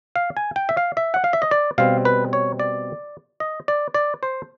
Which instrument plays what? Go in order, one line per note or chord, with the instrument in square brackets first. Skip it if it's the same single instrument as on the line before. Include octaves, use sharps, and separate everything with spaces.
[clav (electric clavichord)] F5
G#5
G5
E5
F5
E5
F#5
F5
E5
D#5
D5
B2 G3 C4 F5
B4
C#5
D5
D#5
D5
D5
C5